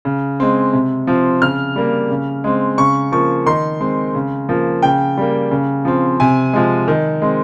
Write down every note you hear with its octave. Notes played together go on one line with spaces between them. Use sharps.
C#3
G#3 C4
C3
F3 C4
C#3 F6
G3 A#3
C#3
G#3 C4
C#3 C#6
F3 A#3 C#6
D#3 C6
G#3 C4
C#3
F3 A#3
C#3 G5
G3 A#3
C#3
F3 C4
C3 G#5
F3 G#3
D#3
G#3 C4